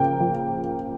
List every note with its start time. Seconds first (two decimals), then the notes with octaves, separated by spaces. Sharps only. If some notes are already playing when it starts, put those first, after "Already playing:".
Already playing: C#3 F3 A#3 G5
0.20 F3